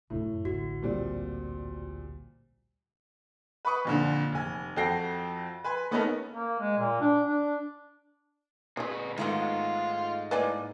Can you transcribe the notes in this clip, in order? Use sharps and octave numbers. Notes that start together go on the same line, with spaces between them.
C2 F#2 A2
A1 D2 F#4
A#2 G3 C4
B4 B5 C#6 D#6
F2 A#2 D3
F1 G#5
F2 F#4 A4 G5 A#6 C7
B4 G#5 C6
A3 B3 C#4 D#4 A4 A#4
A#3
G#3
A#2
D4
D4
A#2 C#3 G#3 B4
G#2 D#3 A3 B3 F4
A2 A#3 B4 D5 D#5 G#5